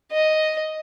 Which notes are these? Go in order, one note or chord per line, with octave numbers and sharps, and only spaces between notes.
D#5